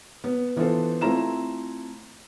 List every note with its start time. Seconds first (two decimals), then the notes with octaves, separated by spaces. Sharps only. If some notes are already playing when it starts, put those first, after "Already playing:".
0.24 B3
0.56 E3 B3 D4 F4 A4 C5
1.01 A3 C4 E4 F4 A#5 E7